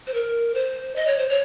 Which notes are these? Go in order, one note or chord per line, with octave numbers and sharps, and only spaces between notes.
C5
A#4
C5
D#5
C#5
C5
C#5